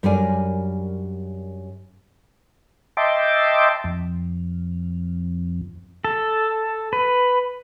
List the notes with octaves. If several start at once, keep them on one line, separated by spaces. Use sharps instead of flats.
F#2 G3 D4 A#4 D5 G#5
D#5 E5 G5 A5 C6 D6
F2
A4
B4